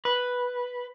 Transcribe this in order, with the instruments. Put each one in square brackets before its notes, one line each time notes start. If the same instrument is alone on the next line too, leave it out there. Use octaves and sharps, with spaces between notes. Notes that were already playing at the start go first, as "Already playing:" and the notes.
[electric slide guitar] B4